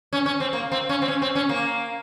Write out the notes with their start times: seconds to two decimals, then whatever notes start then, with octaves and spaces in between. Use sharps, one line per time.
0.13 C#4
0.26 C#4
0.40 C4
0.53 A#3
0.72 C4
0.89 C#4
1.02 C4
1.08 C#4
1.22 C4
1.35 C#4
1.49 A#3